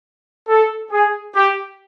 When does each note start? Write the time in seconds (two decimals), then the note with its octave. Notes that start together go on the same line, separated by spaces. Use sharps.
0.48 A4
0.91 G#4
1.34 G4